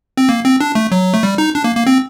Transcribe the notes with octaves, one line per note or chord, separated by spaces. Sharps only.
C4
A#3
C4
D4
A3
F#3
A3
G3
D#4
D4
A#3
A#3
C4